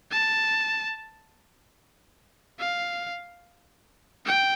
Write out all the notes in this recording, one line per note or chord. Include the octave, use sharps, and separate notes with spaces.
A5
F5
G5